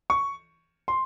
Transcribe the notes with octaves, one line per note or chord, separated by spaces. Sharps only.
C#6
C6